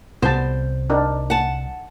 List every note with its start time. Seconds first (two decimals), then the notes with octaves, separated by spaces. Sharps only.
0.22 C2 G3 B3 C5 A5
0.90 D4 D#4 A#4
1.30 F#5 A5